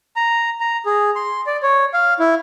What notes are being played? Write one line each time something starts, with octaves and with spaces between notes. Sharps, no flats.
A#5
A#5
G#4
C6
D5
C#5
F5
E4